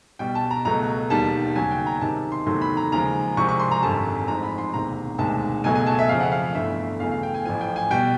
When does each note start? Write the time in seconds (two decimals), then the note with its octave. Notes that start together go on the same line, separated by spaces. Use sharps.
0.19 B1 B2 G3 G5
0.35 A5
0.51 A#5
0.65 C#2 B2 F#3 A3 A#5
1.10 E1 D#2 D#3 G3 A5
1.56 D#2 C#3 F#3 G#5
1.71 G5
1.86 A#5
2.01 C#2 C3 D#3 G3 A5
2.32 C6
2.46 E2 C3 D#3 F#3 A3 C6
2.62 B5
2.77 A#5
2.92 D#2 C#3 F3 G#3 A#5
3.37 C2 C3 F3 G#3 C#6
3.49 C#6
3.60 C6
3.71 A#5
3.83 G#1 F#2 D3 G3 A5
4.28 A1 G#2 F3 G#3 A#5
4.43 B5
4.58 C6
4.73 E1 D2 C3 D#3 A#5
5.18 E1 D2 C3 D#3 G#3 A5
5.64 C#2 B2 F#3 A3 G#5
5.75 G#5
5.86 A5
5.99 E5
6.09 F2 C#3 F3 F5
6.20 F#5
6.32 F5
6.55 G1 G2 E3 A3 E5
7.00 E2 C#3 F#3 A3 F5
7.11 F5
7.23 G5
7.34 G#5
7.45 A1 A2 F3 G#5
7.61 G5
7.76 G#5
7.90 B2 G3 G5